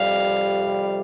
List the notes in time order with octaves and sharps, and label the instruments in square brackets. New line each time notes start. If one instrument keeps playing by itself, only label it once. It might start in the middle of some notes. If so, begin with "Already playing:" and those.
Already playing: [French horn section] F2 C3 G3 [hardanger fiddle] F5